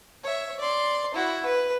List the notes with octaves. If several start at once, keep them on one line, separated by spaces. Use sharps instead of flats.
C#5 E5
D5 C6
E4 F#4
B4